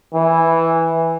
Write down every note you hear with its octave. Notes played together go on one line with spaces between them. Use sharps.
E3